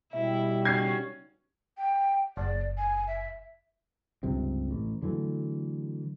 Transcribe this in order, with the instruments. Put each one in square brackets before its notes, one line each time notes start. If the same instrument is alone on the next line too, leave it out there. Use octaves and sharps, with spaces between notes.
[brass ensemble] B2 G3 [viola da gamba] E4 [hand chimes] E5
[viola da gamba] C#3 C#4 F#4 [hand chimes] D#4 [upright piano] G#6 C7
[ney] G5
[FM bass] F#1 [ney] D5
[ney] G#5
E5
[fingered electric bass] C#2 G2 C3 C4
A1
D3 E3 F#3 A3